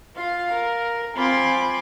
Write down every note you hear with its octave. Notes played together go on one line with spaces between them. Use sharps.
F4 F5
A#4
C4 F4 G#5 B5 C6 D6